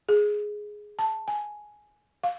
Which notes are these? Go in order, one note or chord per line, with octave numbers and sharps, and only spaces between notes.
G#4
A5
G#5
F5